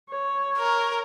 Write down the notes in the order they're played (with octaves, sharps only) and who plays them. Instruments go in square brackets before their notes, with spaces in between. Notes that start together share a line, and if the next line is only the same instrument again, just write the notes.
[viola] C#5
[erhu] A#4